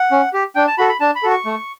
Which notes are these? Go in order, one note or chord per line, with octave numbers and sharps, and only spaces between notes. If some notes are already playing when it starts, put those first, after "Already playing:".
Already playing: F#5
C#4
G4
D4 G5
A5
F#4 A4 B5
B5
D4 A5
B5
F#4 A4
C#6
A3